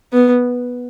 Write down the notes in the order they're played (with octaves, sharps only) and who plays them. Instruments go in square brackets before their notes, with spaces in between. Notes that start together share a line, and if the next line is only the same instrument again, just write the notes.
[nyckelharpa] B3